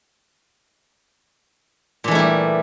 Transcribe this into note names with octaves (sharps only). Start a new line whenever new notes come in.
A#2 E3 G3 A3 E4